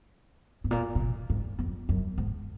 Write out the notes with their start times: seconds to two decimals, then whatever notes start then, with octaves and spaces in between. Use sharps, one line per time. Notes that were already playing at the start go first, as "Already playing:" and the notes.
0.64 G#2
0.71 A#2
0.95 B2
1.00 A#2
1.30 G#2
1.59 F2
1.89 F#2
2.18 G#2